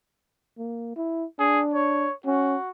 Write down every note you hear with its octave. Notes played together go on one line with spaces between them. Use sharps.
A#3
E4
D4 G#4
C#5
C#4 F#4